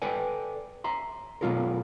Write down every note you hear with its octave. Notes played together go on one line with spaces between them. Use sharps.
A4 B4 D5 G5 G#5
E5 A#5 C6
B2 F3 F#3 F4 A4 A#4